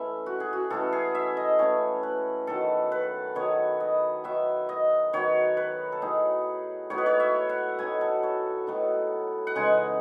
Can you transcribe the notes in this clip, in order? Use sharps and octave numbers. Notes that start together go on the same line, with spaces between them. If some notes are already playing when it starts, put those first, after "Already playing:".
Already playing: E3 A3 C#4 E4 E5
F#4
G#4
F#4
E3 A3 C#4 E4 A4
G#4
E5
D#5
E3 A3 C#4 E4 C#5
B4
D#3 F#3 B3 A4
B4
D#3 F#3 B3 C#5
D#5
D#3 F#3 B3 E5
D#5
D#3 F#3 B3 C#5
B4
A4
A2 F#3 B3 D#4 G#4
A2 F#3 B3 D#4 C#5
B4
C#5
E5
F#5
A2 F#3 B3 D#4 G#5
A4
C#5
A2 F#3 B3 D#4
F#5
C#3 E3 G#3 D#4 G#5